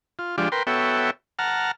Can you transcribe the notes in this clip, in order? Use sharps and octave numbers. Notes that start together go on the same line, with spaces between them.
F4
F3 G#3 D4 F4 G4 D5
A#4 B4 G5 C6
B3 F#4 A4 C#5 E5 G5
F#5 A5 A#5 F6